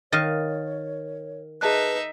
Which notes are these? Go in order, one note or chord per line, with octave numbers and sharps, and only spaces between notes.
D#3 C#5 D#5 F5 F6 A6
D#4 G#4 B4 E5 A5 F#6